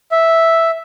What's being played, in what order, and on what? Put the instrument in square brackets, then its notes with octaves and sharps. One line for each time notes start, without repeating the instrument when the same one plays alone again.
[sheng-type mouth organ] E5